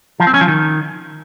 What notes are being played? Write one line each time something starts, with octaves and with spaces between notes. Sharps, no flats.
F3
C4
C#4
F3
D#3